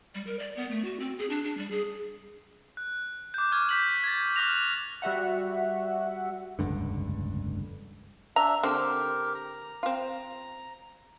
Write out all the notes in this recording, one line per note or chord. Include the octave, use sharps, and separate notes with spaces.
G3
A#4
D5
B3
A3
F#4
C4
G#4
D4
D4
G3
G#4
F#6
D6 G6
C#6 D6 F6 G#6
G6 B6 F#7
G#6 A6
D6 F6 F#6 A#6 F7
G3 F#4 E5 F#5
F1 C#2 G2 D3
D4 E5 A#5
D3 C4 G4 A#4
A#5
C4 F4